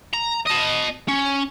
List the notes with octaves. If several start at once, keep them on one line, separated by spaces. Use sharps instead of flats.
A#5
D#5 A5
C#4